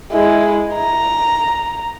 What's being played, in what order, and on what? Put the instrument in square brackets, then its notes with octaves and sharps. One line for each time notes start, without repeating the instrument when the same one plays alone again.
[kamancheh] G#3 E4
A#5